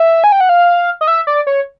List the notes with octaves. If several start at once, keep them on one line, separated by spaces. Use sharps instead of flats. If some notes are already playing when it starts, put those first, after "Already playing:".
Already playing: E5
G#5
G5
F#5
F5
D#5
E5
D5
C#5